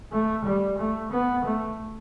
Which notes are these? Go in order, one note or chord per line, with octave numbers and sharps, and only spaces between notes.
A3
G3
A3
B3
A3